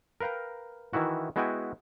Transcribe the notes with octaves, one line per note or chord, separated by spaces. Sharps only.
A#4 B4 F5 G5 A#5
D#3 E3 E4 F#4
G#3 B3 E4 F#4 G5 G#5